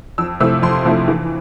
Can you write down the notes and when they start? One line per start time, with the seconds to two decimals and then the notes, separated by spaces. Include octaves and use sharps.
0.18 F2 E6
0.40 C3 F3 A3 E4 E6
0.62 F2 C6
0.85 C3 F3 A3 E4
1.08 E3